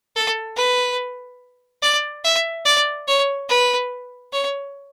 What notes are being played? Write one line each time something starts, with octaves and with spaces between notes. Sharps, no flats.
A4
B4
D5
E5
D5
C#5
B4
C#5